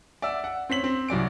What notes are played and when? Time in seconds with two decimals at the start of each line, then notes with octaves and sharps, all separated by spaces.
0.22 D5 E5 F#5 E6
0.44 F#5
0.70 C4 C#5 B6 F#7
0.84 C4
1.08 C2 F#3 D5 D7